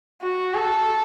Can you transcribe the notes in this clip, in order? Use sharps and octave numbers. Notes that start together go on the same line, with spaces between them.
F#4
A4